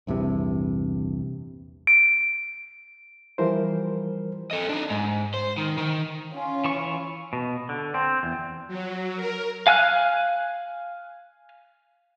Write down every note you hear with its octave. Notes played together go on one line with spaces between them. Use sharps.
A#1 E2 G2 C3
D7
E3 F3 G3 A#4 C5
A4 D#5
D4 D#4
G#2
C5
D#3
D#3
C#4 F4
E3 C#6
B2
D3
C4
E2
F#3
A#4
F5 G#5 F6 F#6